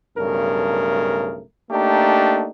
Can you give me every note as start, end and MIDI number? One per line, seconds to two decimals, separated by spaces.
0.17 1.42 35
0.17 1.42 43
0.17 1.42 49
0.17 1.42 57
0.17 1.42 70
1.71 2.49 57
1.71 2.49 58
1.71 2.49 62
1.71 2.49 63
1.71 2.49 67